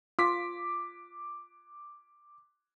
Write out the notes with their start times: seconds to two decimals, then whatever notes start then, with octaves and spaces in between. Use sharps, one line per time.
0.19 F4 D6 B6